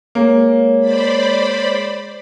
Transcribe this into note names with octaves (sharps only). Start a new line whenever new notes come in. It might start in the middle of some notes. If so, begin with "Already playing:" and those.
G#3 A#3 G#4 C#5
C5 D5 B5